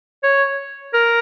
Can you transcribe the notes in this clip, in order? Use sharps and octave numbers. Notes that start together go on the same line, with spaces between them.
C#5
A#4